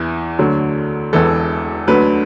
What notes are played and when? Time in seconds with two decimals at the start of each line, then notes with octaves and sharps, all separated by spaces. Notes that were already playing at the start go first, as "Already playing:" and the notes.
Already playing: E2 E3
0.39 D2 D3 F#3
1.13 E1 E2 E3 A4
1.87 D2 D3 F#3 B4